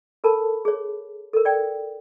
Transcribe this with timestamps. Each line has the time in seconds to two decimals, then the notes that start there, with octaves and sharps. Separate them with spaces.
0.24 A4 A#4 A5 B5
0.65 G#4 C#5
1.33 A4 A#4
1.45 D5 G5